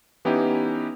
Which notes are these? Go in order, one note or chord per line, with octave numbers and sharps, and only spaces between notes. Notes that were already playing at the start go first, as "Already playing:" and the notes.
E3 B3 C#4 D#4 E4 G4